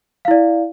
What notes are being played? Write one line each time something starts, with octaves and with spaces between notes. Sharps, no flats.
E4 D5 F5